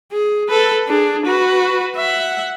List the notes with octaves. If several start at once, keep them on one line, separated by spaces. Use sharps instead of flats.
G#4
A4 B4
D4 G#4
F#4 B4
E5 F#5